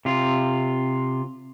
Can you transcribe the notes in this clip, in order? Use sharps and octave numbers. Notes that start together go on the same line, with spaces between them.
C3 F4